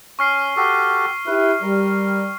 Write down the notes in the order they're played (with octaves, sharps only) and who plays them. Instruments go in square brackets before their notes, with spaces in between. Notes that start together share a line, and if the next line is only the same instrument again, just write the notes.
[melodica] C#4 [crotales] C#6 F6 C7
[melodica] F#4 G4 A4
[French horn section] E4 G4 [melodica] B4
[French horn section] G3 [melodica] A#4